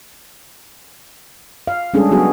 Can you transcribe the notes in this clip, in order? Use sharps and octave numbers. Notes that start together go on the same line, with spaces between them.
F5
G3 G#3 C#4 D4 G#4 A4
F#3 B3 F#4 G#4